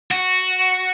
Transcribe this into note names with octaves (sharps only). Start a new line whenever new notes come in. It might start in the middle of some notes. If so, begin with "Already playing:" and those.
F#4